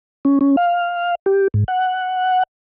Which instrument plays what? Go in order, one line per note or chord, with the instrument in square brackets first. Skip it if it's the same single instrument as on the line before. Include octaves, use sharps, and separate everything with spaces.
[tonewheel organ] C#4
C#4
F5
G4
G#2
F#5